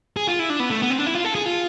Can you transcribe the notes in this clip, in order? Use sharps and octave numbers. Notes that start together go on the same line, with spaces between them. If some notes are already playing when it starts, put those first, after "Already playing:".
G#4
F4
E4
D4
B3
A3
B3
C4
D4
E4
F4
A4
G#4
F4